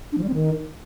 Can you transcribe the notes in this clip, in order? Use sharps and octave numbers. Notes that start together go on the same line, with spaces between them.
D4
F3
G3
C4
D#3